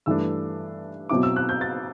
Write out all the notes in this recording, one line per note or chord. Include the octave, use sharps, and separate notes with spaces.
G2 E3 A3 D4 E6
B2 F#3 C4 E4 D6
E6
F#6
G6
A6